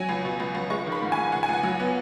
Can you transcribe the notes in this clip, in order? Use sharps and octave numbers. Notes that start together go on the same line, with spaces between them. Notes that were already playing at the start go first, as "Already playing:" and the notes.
Already playing: F#3 G#5
C#2
B2
C#2
C#2
G#3 C#6
D#3
B5
G#2
G#5
G#2
C#2 F#5
G#5
C#2 F#5
F#3
B3